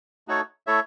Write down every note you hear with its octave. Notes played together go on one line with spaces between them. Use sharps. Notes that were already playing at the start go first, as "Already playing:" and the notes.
A3 D#4 F#4 A4 C#5
A3 E4 A4 C#5 E5